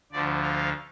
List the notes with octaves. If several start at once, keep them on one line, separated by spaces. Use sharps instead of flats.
D2 D3 F3 D5
F5